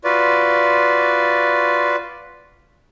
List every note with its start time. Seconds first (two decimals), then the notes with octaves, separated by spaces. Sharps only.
0.04 F4 F#4 B4 D5